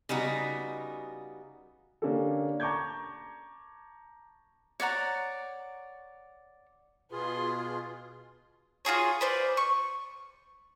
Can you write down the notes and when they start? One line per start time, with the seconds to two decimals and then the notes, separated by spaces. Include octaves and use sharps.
0.09 C#3 G3 B3 D#4 F#4
2.02 D3 A#3 C#4 D4 G4 A4
2.60 A5 A#5 C#6 D6 G6 G#6
4.80 C#5 D5 F#5 A#5
7.12 B2 F4 G#4 B4 C6
8.85 F4 F#4 G#4 C#5
9.21 B4 C5 D5 F5
9.57 C#6